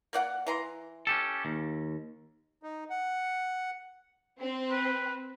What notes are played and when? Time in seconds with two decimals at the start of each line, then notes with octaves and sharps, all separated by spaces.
0.13 A#3 D5 F#5
0.47 E3 A#5 C6
1.07 C#4 G4 A4
1.45 D#2
2.63 D#4
2.90 F#5
4.41 C4
4.71 B4